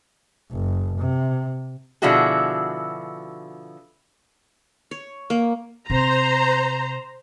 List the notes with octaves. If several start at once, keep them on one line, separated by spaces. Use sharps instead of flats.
F#1
C3
B2 D3 F3 E4 F#4 G#4
C#5
A#3
C3 C5 A#5